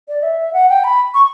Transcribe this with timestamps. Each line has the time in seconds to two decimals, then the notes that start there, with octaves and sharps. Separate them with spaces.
0.09 D5
0.23 E5
0.53 F#5
0.69 G5
0.84 B5
1.14 C#6